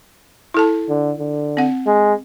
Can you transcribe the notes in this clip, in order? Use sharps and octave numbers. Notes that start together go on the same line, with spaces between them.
E4 A4 A5
D3
D3
C4 F#5
G#3